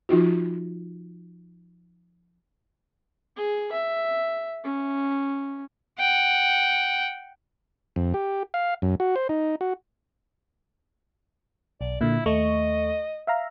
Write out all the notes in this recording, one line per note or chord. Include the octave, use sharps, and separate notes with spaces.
F3 D#4 F4 F#4
G#4
E5
C#4
F#5 G5
F2
G4
F5
F#2
F#4
C5
D#4
F#4
B1 D5
A#2 D3 E4
D#2 A3 D#5 C#6
E5 F5 A#5